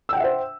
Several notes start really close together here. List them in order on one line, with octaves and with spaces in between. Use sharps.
E6 G5 F#5 E5 C5